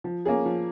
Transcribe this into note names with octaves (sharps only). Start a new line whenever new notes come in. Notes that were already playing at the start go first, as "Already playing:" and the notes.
F3
A#3 C#4 G#4
F3